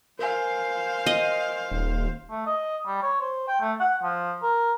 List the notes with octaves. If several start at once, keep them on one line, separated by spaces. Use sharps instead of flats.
A#4 C5 F5 G#5
D#5
D#1
A3
D#5
G3
C#5
C5
G5
A3
F#5
F3
A#4